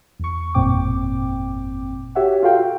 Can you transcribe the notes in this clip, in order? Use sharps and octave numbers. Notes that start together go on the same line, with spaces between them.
E2 C#6
G1 F2 A#2 C4 G5 D6
F#4 G4 C#5 E5 F#5
F4 F#4 A4 F5 G5